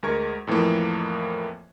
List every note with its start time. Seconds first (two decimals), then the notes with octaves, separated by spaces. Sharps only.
0.03 D2 G#3 A#4 C#6 G#6
0.47 F2 A2 E3 F3 A#3